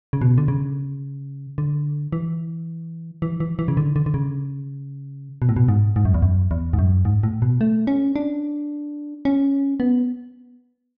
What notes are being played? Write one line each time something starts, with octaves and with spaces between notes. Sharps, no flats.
C#3
B2
D3
C#3
D3
E3
E3
E3
E3
C#3
D3
D3
D3
C#3
B2
A2
B2
G#2
G#2
F#2
E2
F#2
E2
G#2
F#2
G#2
A2
B2
A3
C#4
D4
C#4
B3